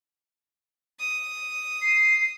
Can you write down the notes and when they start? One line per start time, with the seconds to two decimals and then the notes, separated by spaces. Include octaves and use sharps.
1.00 D#6
1.82 C7